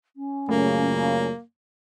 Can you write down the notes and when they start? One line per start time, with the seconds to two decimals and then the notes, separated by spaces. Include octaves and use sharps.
0.16 C#4
0.49 F#2 A#2 C#3 A3 A#3